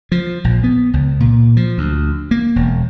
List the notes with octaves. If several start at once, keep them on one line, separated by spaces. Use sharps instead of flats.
F3
A#1
B3
C#2
A#2
F3
D2
A#3
E1